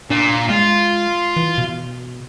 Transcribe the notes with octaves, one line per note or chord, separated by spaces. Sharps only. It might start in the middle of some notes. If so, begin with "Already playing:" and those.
A#2 D4
G#3 F4
E3
B2